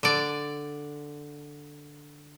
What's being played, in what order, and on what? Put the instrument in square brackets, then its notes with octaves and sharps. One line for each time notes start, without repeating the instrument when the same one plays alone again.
[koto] D3 D5